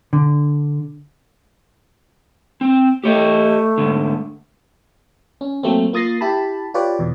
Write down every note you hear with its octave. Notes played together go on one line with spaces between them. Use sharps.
D3
C4
A3 G4 C#5 D#5
G#2 D3
C#4
F#3 A3 A#3 C4
A#3 F4 D#6 A6 A#6 C7
E4 G4 A5 B5
F4 G4 B4 C#5 D5
E2 B2